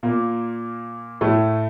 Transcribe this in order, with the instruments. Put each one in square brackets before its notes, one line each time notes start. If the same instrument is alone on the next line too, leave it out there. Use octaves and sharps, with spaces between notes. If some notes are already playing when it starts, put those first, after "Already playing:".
[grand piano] A#2 A#3
A2 A3